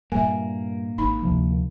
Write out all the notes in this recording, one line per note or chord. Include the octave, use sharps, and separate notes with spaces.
G2 A#2 A#3 E5 G#5
G#1 D#4 B5
D2 C3 F3